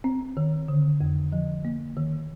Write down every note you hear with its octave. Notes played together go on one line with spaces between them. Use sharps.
C4
D#3
D3
F2
F3
A#3
D#3